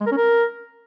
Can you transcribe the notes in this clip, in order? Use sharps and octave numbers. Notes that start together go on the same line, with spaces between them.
G#3
A#4
C#4
A#4